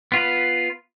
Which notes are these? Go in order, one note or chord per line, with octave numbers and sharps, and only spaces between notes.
B3 F4 B4